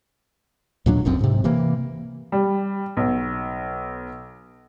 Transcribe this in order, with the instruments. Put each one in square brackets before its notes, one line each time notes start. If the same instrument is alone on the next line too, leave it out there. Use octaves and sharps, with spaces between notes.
[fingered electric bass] D#2 A#2 F#3 D4
F1 B1 F#2 C4
G#2 C3
C3 E3 A#3
[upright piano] G3
B1